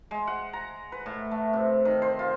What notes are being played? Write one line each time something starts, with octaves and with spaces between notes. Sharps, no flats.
G#3
F#5
A#5
B4
A2
A3
C3
D#3
C5
F4